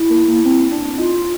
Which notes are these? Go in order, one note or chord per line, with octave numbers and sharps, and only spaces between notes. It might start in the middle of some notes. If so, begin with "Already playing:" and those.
Already playing: E4
A#3
A#3
C4
D4
D#4 F4